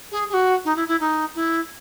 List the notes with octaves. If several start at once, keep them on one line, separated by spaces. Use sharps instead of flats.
G#4
G#4
F#4
D#4
E4
E4
D#4
E4